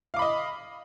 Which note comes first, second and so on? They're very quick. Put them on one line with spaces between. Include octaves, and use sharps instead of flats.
F5 D6 B5 D#5